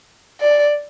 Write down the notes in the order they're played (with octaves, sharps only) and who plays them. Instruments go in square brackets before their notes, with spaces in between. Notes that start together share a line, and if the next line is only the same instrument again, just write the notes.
[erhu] D5